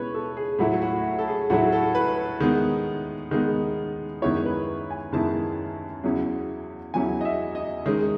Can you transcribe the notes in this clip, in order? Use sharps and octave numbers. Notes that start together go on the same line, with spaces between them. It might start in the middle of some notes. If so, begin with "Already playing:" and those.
Already playing: B2 G#3 C#4 E4 B4 C#5
A4
G#4
A2 F#3 A3 E4 F#4
F#4
A4
G#4
A2 F#3 A3 E4 F#4
A4
B4
D#3 G#3 B3
D#3 G#3 B3
F#2 D#3 G#3 B3 E4 C#5
B4
G#5
F#2 D#3 G#3 B3 E4 A5
E2 C#3 F#3 C#4 E4
E2 C#3 F#3 C#4 E4 G#5
D#5
E5
D#5
D#3 G#3 C#4